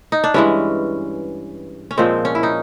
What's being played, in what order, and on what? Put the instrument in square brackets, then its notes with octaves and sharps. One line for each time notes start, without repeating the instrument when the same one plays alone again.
[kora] D#4
D4
G2 E3 G#3 C#4
C#4
A#2 F3 G#3 C4
C#4
E4
D#4